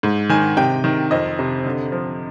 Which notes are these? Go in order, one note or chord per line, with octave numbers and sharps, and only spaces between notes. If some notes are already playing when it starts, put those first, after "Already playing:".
G#2
D#3 G#5
C3 G5
D#3
F2 D#5
C3
D3
F3